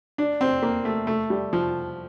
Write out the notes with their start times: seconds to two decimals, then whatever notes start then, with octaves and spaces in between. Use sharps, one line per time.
0.18 D4
0.41 C4
0.62 A#3
0.85 A3
1.07 A3
1.30 G3
1.53 F3